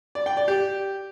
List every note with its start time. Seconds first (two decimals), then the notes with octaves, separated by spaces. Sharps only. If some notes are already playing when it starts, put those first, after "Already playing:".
0.15 D5
0.26 G5
0.37 D5
0.48 G4